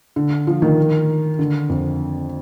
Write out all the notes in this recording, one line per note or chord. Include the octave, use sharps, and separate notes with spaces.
D3
F3
D#3
D3
F2